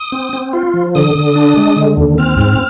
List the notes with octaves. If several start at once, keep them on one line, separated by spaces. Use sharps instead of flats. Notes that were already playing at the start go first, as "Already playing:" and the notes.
Already playing: D#6
C4
C4
F4
F3
D3 D#6
D3
D4
G#3
D3
D#2
C4 F6
G#2